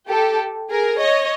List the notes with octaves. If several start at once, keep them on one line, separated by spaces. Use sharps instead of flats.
G4 A4
G#4 A#4
C#5 D#5